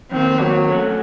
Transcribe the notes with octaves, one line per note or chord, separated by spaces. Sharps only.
F2 D#3 A#3 C4
F#3
A3 C#4 F#4